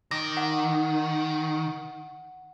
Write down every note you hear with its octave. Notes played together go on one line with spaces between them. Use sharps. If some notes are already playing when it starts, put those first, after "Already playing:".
D#3 D6 A#6
F#5